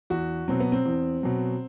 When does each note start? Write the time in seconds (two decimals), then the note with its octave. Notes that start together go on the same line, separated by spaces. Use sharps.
0.10 E2 F#4
0.48 B2 F#3 C4
0.60 B3
0.72 C4
0.86 E2
1.23 B2 F#3